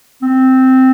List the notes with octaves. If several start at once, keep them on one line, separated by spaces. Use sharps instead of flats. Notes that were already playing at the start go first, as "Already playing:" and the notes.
C4